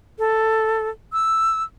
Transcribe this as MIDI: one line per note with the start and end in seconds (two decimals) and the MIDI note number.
0.19 0.89 69
1.13 1.63 88